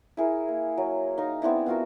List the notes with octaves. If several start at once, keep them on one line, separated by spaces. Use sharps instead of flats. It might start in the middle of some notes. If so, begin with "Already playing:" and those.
E4 G#4 A#4
A#3
F#3
D#4 F5 D#6
B3 C4 D4 E4
B3 F4 F#4 A#4